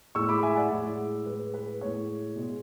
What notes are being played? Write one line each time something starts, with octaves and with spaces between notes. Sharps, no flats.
A2 G#3 C#6 E6
B5 D6
E5 G#5
D5 F#5
A2 G#3
A2 G#3 B4
B4
A2 G#3 C#5
B2 G#3